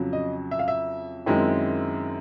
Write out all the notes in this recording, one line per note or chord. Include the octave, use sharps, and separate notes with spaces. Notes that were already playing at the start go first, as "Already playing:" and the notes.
Already playing: F2 C#3 F#3
D#5
E5
F5
E5
F#2 D#3 G#3 C4 E4